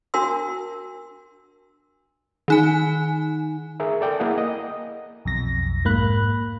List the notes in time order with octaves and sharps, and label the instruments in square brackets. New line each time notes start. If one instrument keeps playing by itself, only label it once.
[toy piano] D4 F#4 A#4 A5 C6 E6
[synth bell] D#3 D#4 G#5
[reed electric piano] G#4 A#4 E5
A4 D5 G5
A#3 E4 G#4 F#5
D#5
[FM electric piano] B1 F2 A#6
G#2 A#3 B5 F#6